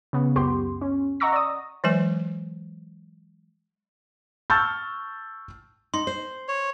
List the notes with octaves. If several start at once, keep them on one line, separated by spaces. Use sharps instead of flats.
C#3 B3
C#2 F#2 B3 G4 C6
C#4
D#5 F#5 A#5 C#6 E6 A#6
D5 D#6
E3 F#3 G#3 B4 G#5
A5 C#6 E6 F6 G6 A6
D#4 C6
C5
C#5